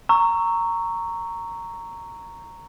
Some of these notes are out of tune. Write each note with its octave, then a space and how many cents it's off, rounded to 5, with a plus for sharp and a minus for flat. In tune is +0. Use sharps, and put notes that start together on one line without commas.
A#5 -10 C#6 +0 E6 +0